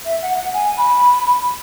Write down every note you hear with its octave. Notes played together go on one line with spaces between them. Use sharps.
E5
F#5
F#5
G#5
B5